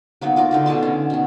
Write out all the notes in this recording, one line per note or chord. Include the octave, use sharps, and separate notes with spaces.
F#3 A#3 B3 D#4
F4 A#4 D5 A#5
D3 D#4 F#4
B2 G#4 A5 C6
C#4
B2 D#3